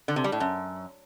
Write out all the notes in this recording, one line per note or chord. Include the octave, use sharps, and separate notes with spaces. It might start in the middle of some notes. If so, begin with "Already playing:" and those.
D3
C3
G3
A2
F#2